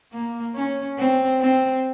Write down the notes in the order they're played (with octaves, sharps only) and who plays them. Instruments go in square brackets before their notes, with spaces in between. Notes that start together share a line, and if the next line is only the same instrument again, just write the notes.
[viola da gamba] A#3
C#4
C4
C4